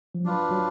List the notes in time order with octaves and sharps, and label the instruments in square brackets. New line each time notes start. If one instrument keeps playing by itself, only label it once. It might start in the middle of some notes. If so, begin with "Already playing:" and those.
[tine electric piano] F3
[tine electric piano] F#3 [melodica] D4 F4 B4
[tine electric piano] F#3